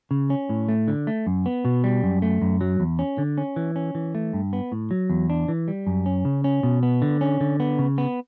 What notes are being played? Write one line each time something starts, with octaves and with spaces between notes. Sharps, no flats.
C#3
C#4
A2
A3
D3
A3
F#2
B3
B2
G3
F#2
A3
F#2
F#3
E2
C#4
D3
C#4
E3
C#4
E3
A3
G2
B3
A2
F#3
E2
D4
E3
G3
F#2
C#4
C#3
C#4
B2
B3
D3
C#4
D3
B3
C#3
B3